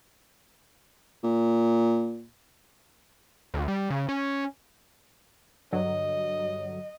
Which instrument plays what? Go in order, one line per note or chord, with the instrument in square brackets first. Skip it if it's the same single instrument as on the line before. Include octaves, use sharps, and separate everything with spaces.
[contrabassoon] A#2
[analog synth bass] D2
G3
C#3
C#4
[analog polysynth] G2 D3 F#3 [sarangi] D#5